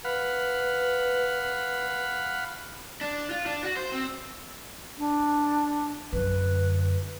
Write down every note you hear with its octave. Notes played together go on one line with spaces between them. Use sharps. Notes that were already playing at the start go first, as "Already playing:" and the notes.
B4 F5 F#5 B5
D4
F4
D4
F#4
C5
C4
D4
F#2 D3 B4